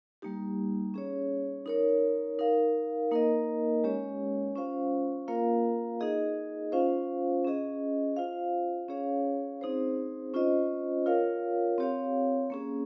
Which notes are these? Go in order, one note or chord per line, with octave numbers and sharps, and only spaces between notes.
G3 A#3 D#4 G4
C#4 G#4 C#5
D#4 A#4 C#5
D#4 A#4 F5
A#3 D#4 A#4 D#5
G#3 C#4 G4 C#5
C#4 F4 C5 F5
A#3 F4 A#4 F5
D#4 G#4 D#5
C#4 F4 C5 F5
C#4 G#4 D#5
F4 C5 F5
C#4 G#4 C#5 F5
C4 D#4 G#4 C5
C#4 F4 C5 D#5
F4 A#4 C#5 F5
C4 G4 C#5 F5
A#3 C#4 G#4